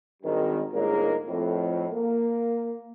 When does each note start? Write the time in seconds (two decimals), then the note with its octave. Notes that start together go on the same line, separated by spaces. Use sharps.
0.23 G#1 G2 D#3
0.73 G1 G#2 G#3 A#3 A#4 C#5
1.28 F2 A2
1.92 A#3